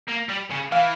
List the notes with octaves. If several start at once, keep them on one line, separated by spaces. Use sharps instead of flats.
A#3
G3
C#3
E3 F5